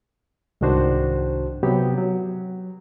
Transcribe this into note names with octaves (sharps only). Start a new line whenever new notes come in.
C2 G#2 D#3 D4 F#4 C5
C3 F#3 B3 G4
F#3